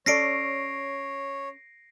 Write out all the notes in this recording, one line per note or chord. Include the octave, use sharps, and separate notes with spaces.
C#4 A4 C#5 D5 A#6 C7 D7